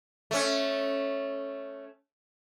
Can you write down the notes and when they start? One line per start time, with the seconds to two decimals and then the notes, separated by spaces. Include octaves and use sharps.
0.31 A3 C#4